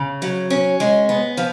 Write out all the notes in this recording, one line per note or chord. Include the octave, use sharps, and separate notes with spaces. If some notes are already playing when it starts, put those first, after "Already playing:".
Already playing: C#3
F#3
C#4
G#3
B3
F3